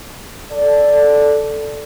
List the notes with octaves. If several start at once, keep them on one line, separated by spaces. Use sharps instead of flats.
A4 D5